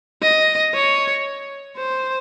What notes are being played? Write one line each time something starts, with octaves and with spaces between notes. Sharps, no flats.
D#5
C#5
C5